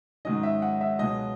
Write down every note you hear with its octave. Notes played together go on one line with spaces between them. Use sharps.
G#2 D#3 F#3 C#4 D#5
E5
F#5
E5
C#2 B2 F#3 D#5